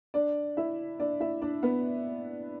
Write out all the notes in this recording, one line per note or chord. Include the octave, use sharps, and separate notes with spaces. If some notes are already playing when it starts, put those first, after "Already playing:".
D4 D5
E4 E5
D4 D5
E4 E5
D4 D5
B3 B4